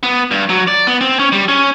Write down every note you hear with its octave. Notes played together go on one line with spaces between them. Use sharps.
B3
G2
F#3
D5
B3
C4
C#4
G3
C#4